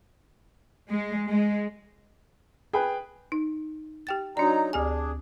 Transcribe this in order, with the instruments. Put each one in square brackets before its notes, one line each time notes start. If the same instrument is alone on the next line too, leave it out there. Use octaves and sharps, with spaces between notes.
[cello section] G#3
G#3
[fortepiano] G#4 [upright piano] B4 G5
[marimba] D#4
G4 G5 A6
[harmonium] F#3 D#4 A#5 [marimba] D4 D5
[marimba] D2 G4 G#5 [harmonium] D4 G#4